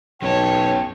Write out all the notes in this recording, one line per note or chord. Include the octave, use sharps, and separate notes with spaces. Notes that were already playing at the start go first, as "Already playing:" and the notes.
B1 F#2 C#5 G5 A5